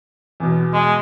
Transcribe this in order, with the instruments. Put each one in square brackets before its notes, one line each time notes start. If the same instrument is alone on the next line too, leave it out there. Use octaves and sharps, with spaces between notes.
[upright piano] E2 B2
[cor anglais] G#3